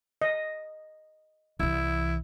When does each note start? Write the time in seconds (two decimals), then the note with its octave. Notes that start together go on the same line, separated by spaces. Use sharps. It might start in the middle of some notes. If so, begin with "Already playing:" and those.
0.22 D#5
1.60 C2 E3 E4